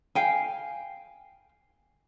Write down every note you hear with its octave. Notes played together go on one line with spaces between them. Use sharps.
F5 G5 G#5